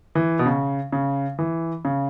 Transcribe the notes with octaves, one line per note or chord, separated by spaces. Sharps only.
E3
B2
C#3
C#3
E3
C#3